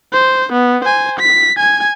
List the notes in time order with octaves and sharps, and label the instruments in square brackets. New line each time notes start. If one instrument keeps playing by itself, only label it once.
[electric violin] C5
B3
C5 G#5
B6
G#5 G#6